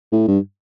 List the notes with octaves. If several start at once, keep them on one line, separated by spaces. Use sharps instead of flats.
A2
G2